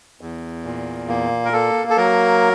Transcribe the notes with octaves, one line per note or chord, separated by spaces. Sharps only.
E2
A#2
A#3
A#4
A#3 A4
A4
F#3 A#4